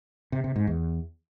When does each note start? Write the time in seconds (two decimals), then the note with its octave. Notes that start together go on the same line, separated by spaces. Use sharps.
0.32 C3
0.44 C3
0.56 G#2
0.67 E2